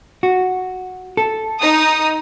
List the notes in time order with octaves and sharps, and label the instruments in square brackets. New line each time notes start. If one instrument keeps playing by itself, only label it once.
[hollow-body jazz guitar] F#4
A4
[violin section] D#4 D#6